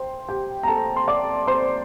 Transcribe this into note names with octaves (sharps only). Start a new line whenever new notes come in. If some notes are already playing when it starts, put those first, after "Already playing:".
Already playing: C5 G5 C6
G4 G5
A#5
A4 A5
C6
D5 D6
C5 C6